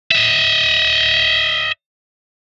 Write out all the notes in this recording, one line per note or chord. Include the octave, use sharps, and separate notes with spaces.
D#5 E5